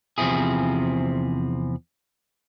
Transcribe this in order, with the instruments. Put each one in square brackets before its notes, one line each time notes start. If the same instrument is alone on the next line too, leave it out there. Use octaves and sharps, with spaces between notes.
[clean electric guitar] E2 C3 F3 C4 E4 G#4